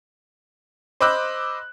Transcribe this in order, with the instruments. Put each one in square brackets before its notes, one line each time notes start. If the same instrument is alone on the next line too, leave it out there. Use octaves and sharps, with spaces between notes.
[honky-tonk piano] C5 D#5 B5 D6 E6 F#6